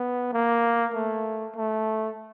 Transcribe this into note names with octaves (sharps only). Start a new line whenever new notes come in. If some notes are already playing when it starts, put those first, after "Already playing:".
Already playing: B3
A#3
A3
A3